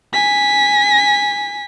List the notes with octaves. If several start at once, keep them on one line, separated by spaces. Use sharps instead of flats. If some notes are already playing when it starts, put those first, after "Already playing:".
G#5 B6